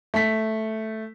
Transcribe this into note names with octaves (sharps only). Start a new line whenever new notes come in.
A3 B6